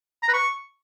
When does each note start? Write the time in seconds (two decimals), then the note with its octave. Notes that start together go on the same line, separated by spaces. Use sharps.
0.23 A#5
0.28 B4
0.33 C#6